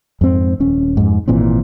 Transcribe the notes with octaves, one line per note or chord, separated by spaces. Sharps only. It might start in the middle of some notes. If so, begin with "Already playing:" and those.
F2 G#2 C4
D#1 C#4
F2 G#2
G#1 A#2 E3 C4